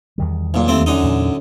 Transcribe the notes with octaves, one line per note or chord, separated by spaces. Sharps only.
E2 D#3 G3
B1 A#2
D#2 A3 C4
F#2 D3 D#4
E2 A#2 F#3